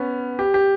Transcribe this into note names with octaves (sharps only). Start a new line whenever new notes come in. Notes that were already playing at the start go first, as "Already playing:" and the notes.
Already playing: B3 C#4
G4
G4